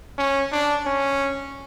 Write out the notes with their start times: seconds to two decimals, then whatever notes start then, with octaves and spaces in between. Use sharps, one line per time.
0.18 C#4
0.52 D4
0.86 C#4